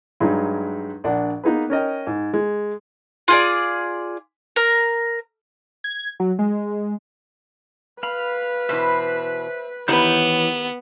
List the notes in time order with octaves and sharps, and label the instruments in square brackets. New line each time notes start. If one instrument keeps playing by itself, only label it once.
[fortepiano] G2 F#3 G#3 D#4
A#1 D4 F#5
A#3 B3 D#4 G#4 B4
C#4 A#4 D#5 G5
G#2
G#3
[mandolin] F4 G#4 D5
A#4
[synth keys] G#6
F#3
G#3
[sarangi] B4 [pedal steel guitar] F5 B5
[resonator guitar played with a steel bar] B2 E3 [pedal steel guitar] C5 E5
[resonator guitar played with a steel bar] D#3 E4 G4 [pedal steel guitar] E3 C#5 G6 [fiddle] B3